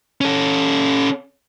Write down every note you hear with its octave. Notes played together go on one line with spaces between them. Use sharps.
C#4 A4